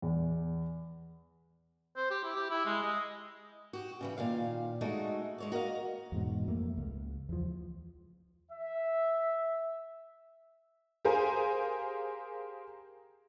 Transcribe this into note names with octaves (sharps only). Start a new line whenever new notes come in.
E2
C5
G4
E4
G4
E4
G#3
D#5
F#4 G4
C#3 E3 G3
A#2 D#3 F5
G#3 A3 D#4 F#4
G#3 C#5 D5
F#4 A#4 D#5 F5
E2 G#2 B2
F2 A3 A#3
C#2
E2 F3
E5
G4 G#4 A#4 C5 F5 G#5